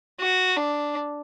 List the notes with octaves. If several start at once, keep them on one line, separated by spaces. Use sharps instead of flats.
F#4
D4